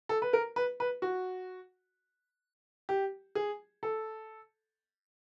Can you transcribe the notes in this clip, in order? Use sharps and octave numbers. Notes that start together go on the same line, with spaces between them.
A4
B4
A#4
B4
B4
F#4
G4
G#4
A4